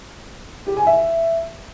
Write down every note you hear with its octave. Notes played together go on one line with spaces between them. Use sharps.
G4
G#5
E5